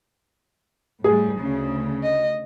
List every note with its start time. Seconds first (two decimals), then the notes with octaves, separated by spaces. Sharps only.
1.04 A2 G3 G#4
1.39 D2 C#3
2.03 D#5